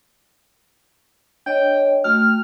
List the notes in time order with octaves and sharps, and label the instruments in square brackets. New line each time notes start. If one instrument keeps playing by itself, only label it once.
[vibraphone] D4 C#5 D#5 [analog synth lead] G5
[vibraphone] A3 F#4 G5 [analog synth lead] F6